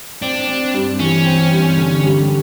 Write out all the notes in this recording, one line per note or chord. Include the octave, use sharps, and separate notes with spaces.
C4 D4
C4
G2
E3 C#4
C4
G2
D3
G3